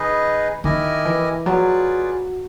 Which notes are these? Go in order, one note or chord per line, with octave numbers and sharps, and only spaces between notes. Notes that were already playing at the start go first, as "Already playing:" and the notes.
Already playing: D#3 D#4 G#4 B4 D#5
D#3 E4 G4 A#4 D#5 G#5
E3
F#3 F4 G#4 B4 D5